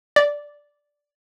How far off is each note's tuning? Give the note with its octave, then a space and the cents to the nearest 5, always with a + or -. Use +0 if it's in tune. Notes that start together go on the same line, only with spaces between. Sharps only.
D5 -5